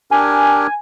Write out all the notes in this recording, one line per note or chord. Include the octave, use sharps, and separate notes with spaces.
D4 G4 A#4 G#5